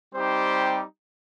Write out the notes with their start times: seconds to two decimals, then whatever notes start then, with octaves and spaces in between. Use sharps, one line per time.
0.14 G3 C4 D#4 G4 C5